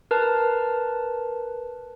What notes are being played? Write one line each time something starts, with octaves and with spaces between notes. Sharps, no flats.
A#4 B4 A5